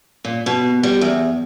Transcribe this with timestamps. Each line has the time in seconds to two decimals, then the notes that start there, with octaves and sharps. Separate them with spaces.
0.25 A#2
0.46 B2
0.83 G3
1.01 E2